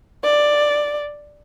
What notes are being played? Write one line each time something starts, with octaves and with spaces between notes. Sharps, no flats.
D5